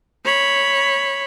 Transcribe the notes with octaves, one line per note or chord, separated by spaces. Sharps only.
C#5 B5